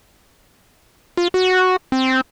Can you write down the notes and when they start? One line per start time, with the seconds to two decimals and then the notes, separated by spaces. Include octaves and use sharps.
1.17 F4
1.34 F#4
1.92 C4